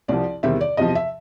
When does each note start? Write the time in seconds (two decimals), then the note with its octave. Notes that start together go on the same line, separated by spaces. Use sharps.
0.08 C2 C3 F3 D5
0.43 E2 C3 D#3 G3 C4 E5
0.61 D5
0.77 E2 C3 F3 D#5
0.95 E5